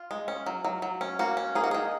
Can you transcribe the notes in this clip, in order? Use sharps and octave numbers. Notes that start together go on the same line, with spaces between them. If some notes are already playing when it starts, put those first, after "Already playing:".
Already playing: F4
G#3
C#4
F#3
F#3
F#3
C#4
A#3 F#4
C#4
A#3 G#4
F#4
D#3 G#4